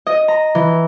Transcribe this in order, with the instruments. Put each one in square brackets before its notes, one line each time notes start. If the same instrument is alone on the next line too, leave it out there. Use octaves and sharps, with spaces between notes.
[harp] D#5
A#5
E3